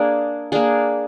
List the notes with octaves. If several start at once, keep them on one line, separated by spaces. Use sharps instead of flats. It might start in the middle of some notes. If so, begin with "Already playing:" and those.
Already playing: A#3 D4 G#4
A#3 D4 G#4